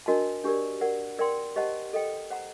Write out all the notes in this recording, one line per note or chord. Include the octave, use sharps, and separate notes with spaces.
D4 F#4 A#4 D#5 A5
D4 G4 A#4 D5
A#4 D5 F#5
A#4 D5 G5 C6
G4 C5 D#5 F#5 A5
A4 D#5 G5
C5 F#5 A#5